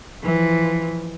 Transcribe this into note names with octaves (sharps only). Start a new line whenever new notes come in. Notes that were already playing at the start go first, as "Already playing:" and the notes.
E3 F3